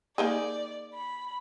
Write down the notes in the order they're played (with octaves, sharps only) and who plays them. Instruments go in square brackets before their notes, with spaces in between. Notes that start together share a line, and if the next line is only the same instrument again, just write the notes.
[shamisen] A#3 D#4 G#4 [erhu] D5
[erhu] B5